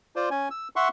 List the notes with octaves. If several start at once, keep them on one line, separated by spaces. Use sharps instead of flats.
F4 C5 D5
C#4 G#5
E6
E5 F#5 C6 C#6